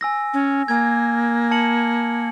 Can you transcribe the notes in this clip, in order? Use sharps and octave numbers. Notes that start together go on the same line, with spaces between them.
G#5 E6 A#6
C#4
A#3 G#5 G#6
A5 C#7 F#7